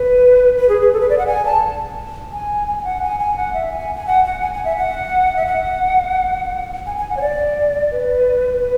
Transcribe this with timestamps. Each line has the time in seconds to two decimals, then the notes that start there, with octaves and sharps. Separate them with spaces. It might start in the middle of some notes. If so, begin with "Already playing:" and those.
Already playing: B4
0.57 B4
0.69 G#4
0.81 G#4
0.93 A4
1.01 B4
1.09 D5
1.18 F#5
1.27 G#5
1.45 A5
2.33 G#5
2.68 G#5
2.79 G#5
2.84 F#5
3.02 G#5
3.20 G#5
3.37 F#5
3.54 E5
3.72 G#5
3.95 G#5
4.07 F#5
4.24 F#5
4.42 G#5
4.53 G#5
4.65 E5
4.77 F#5
5.36 E5
5.47 F#5
6.86 G#5
6.97 G#5
7.10 F#5
7.17 C#5
7.21 D5
7.91 B4
8.61 B4